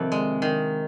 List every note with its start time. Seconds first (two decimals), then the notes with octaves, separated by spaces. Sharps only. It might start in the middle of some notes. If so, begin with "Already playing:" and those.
Already playing: F2 C3 D#3
0.12 G#3
0.42 D#3